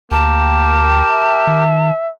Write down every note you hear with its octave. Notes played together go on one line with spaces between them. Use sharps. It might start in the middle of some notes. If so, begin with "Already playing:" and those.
D2 A#3 G4 A#4 G5 A5
E5
D#3